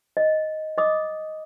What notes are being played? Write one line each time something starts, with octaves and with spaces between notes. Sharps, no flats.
D#5
D#5 D6 D#6